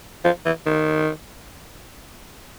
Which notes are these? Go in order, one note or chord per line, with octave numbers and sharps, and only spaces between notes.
F3
E3
D#3